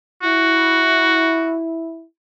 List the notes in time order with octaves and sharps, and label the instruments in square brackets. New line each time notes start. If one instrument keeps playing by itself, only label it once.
[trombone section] E4 [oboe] F#4